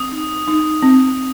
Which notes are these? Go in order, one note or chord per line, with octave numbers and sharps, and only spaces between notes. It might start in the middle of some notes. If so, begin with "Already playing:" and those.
Already playing: C4 D#6
D#4
D#4
C4